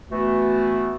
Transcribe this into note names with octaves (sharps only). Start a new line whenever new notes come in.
E3 A3 B3 F#4